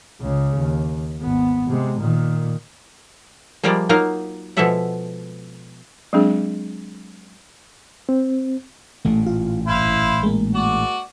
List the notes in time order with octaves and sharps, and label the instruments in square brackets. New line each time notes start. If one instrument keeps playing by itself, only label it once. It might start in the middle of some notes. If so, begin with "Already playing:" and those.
[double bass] C#2 C#3
D#2
G#1 B3
C3 G#3
A#2 D#3
[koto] F3 G3 G#3 A#3 F4 D5
F#3 A#3 D#4 F4 A#4 F5
B2 F3 G#3 A4 E5 F#5
[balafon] F#3 G#3 C4 D4 G#4
[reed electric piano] C4
[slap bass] A1 A#2 [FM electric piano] A3
[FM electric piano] F4
[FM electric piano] G1 [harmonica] E4 C5 F5
[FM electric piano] G#3 A#3
[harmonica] F#4 D5